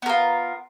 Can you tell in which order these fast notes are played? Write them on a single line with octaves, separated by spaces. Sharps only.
B3 A#4 F4